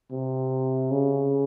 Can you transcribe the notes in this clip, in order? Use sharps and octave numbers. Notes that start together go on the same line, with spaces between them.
C3
C#3